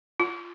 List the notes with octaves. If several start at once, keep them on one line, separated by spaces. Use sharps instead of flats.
F4